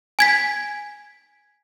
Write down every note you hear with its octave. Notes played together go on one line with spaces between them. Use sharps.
G#5 G#6 B6